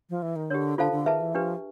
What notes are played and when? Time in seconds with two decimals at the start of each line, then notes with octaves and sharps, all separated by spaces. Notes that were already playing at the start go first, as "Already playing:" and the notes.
0.10 F3
0.22 E3
0.36 D#3
0.50 D3 G4 A#4 C#5
0.78 D3 F4 A4 C5 F5 A5
0.92 D3
1.06 D#3 G#4 B4 E5 A5
1.20 E3
1.34 F3 D4 G4 B4